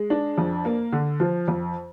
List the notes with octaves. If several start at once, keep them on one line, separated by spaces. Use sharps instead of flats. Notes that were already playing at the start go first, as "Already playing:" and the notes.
Already playing: G#3
D4
F2
A#3
D3
F3
F2